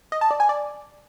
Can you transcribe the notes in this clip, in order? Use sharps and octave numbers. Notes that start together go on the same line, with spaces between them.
D#5
A5
D5
G#5
D5